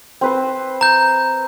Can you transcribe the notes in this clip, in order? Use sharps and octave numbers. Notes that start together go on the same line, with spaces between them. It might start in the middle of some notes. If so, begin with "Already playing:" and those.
C4 B4 C5
A#5 G6